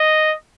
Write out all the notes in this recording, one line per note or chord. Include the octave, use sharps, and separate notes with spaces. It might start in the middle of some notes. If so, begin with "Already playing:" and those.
Already playing: D#5